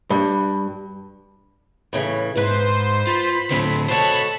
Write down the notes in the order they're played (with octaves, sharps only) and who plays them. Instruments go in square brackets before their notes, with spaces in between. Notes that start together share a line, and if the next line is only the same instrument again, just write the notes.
[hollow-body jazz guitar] G2
[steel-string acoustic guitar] A2 C#3 E3
[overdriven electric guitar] G#2 [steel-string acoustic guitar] B4 [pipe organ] C5
[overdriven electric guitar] F4 [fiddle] B5
[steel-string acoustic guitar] F2 C4 [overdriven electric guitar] A2 D3
[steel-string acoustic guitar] B2 F#4 A4 [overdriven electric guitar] C5 C#5 [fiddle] A5 [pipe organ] B5